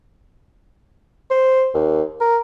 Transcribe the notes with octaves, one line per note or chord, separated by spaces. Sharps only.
C5
D#2
A#4